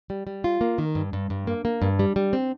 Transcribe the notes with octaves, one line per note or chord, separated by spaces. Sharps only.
G3
G3
F4
A#3
D#3
G2
G2
G2
A#3
A#3
G2
G3
G3
C4